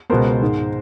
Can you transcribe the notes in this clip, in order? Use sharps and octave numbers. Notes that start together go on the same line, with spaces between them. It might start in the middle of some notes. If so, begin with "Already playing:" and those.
C#2 B2 G#3 B3 A#4 C5
G#2 D#3 G#3